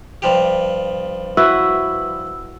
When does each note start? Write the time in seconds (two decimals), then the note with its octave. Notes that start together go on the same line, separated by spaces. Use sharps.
0.22 G2 F3 G4
1.37 E4 F#4 B4 E6